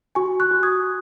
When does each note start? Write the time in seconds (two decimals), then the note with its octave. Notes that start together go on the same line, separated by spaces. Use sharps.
0.15 F#4 G#5 C#6
0.40 C#6 F#6
0.51 F#4
0.63 D#6 G#6